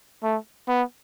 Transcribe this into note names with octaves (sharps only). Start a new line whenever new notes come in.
A3
B3